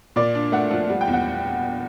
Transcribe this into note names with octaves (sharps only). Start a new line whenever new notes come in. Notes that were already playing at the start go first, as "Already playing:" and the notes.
A#2 D5
D4
A3 F#5
F3
G3
G5
E2
F#5